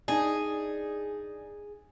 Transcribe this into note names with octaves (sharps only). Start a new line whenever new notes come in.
D4 D#4 G#4